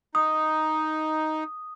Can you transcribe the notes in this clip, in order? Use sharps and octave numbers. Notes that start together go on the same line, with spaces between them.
D#4 D#6